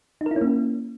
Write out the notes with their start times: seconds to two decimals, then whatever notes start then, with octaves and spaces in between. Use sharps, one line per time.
0.21 D#4
0.26 A#4
0.31 E4
0.36 C#4
0.41 A#3